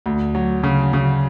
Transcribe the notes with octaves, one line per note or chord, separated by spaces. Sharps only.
D2
F#3
C#3
C#3